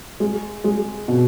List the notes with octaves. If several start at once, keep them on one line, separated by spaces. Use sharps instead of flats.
G#3
G#3
B2